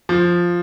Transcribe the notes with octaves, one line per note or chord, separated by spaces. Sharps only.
F3